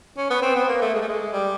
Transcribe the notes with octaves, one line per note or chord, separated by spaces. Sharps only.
C#4
B3
C4
B3
A#3
A3
G#3
A3
G#3
G3